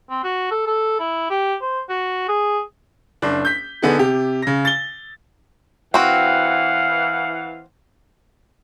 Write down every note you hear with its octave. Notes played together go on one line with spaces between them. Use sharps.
C4
F#4
A4
A4
E4
G4
C5
F#4
G#4
F#1 D4
G6 B6
D3 B3 D#4 G#4
C3 G4
C#3 A#6
A6 G7
E3 C4 F#4 F5 F#5